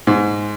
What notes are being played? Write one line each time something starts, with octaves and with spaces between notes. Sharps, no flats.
G#2